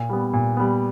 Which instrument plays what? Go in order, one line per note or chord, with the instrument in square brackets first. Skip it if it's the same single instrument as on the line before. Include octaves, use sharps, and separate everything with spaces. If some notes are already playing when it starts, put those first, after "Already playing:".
Already playing: [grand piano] A#2
G3 B3
A#2
G3 B3